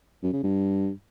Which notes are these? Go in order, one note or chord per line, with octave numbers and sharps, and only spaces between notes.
F#2
C#3
G2